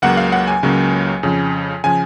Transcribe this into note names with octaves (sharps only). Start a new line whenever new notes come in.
C#2 C#3 F#3 A#3 F#5
F5
F#5
G#5
C#2 C#3 F#3 A#3
F2 C#3 F3
C#3 F3 G#5